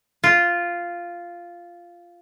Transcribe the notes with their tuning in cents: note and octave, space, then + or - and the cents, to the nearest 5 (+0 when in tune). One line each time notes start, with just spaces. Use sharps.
F4 -5